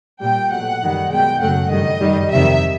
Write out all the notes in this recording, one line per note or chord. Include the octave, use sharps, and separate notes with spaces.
A#2 G3 G5
B2 F#3 A3 F#5
F#2 D#3 G3
B2 G#3 G5
F#2 C#3 F#3 A3 F#5
G2 D#3 G3 D#5
F#2 D#3 G3
F2 C3 D#3 G3 E5